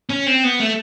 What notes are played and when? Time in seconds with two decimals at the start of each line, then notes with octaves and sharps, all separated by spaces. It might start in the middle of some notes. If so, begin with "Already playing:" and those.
0.09 C#4
0.26 C4
0.44 B3
0.60 A3